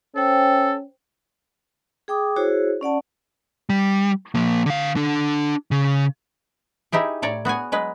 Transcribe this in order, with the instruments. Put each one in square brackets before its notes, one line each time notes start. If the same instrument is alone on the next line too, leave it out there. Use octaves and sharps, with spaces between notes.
[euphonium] C#4 [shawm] A4 [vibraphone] C5 G5
[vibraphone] G#4 G5 D6 D#6
E4 F#4 G#4 C5 C#5
C#4 D5 F#5 A5
[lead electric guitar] G3
F3 A#3
D3 F5
D4 A4
C#3
[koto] D#4 E4 G4 G#4
A2 C#5 D5 A#5
B3 F#4 G#4 G#5
F#3 G#3 B4